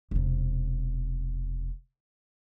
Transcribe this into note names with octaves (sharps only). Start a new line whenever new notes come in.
E1 C3